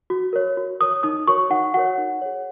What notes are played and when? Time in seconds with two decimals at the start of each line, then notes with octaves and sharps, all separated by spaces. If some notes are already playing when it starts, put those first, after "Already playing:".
0.10 F#4
0.33 A#4 C#5
0.57 F#4
0.81 A#4 C#5 D#6
1.03 D#4 D#6
1.27 F#4 A#4 C#5 C#6
1.50 D#4 F#5
1.74 F#4 A#4 C#5 F#5
1.98 D#4
2.22 G#4 C#5